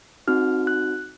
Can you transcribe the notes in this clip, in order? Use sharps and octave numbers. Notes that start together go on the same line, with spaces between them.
C4 D#4 F#4 F6
F#6